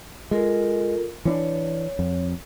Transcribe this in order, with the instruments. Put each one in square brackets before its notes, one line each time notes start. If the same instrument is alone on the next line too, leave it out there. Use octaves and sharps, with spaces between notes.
[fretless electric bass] G#3 [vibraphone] F4 A4 A#4
[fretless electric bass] E3 C4 D4 [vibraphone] C#5
[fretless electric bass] F2